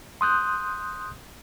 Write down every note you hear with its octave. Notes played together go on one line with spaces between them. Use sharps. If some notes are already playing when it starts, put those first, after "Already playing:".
C6 D#6 F#6 G6